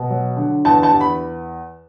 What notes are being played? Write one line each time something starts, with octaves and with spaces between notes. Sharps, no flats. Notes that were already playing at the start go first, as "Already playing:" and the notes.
Already playing: B2
F#3
D3
E2 A5
A5
E2
B5